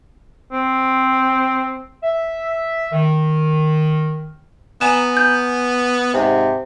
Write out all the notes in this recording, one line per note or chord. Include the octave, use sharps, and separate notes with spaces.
C4
E5
D#3
B3 G#5 A#5 E7
G6
G#2 C3